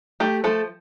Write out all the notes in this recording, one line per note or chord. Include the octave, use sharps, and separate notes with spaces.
A3 G4
F3 A3 A4